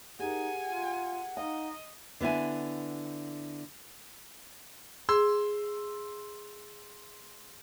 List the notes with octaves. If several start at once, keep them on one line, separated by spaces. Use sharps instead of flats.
D#4 G4 G#4 A#4 F#5 G#5
F4
D#4 D#5 F5
D3 B3 E4 G#5
G#4 C6 E6